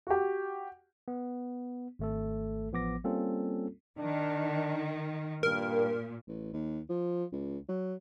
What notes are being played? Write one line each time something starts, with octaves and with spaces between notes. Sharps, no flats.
F#4 G4
B3
G#1 A3 A4
A1 F3 B3 D6 A#6
G3 A#3 C4 C#4 F4 A4
D#3 D4
G2 A#2 A#4
A1
D#2
F3
C#2
F#3